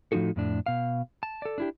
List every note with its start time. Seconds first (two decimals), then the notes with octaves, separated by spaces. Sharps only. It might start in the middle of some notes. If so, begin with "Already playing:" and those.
0.12 A2 F3 C4 D#4 F#4 A4
0.36 F2 A2 D4
0.66 B2 F5
1.23 A5
1.42 A4 D5
1.58 D4 E4 G4